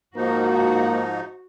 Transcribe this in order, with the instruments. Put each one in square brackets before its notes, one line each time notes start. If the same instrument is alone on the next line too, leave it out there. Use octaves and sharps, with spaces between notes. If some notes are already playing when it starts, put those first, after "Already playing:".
[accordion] G#2 F3 D#4 [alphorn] A#3 [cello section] F#4